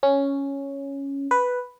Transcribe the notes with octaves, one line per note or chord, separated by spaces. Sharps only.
C#4
B4